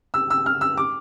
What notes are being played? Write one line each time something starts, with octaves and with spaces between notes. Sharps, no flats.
E6
E6
F6
E6
D6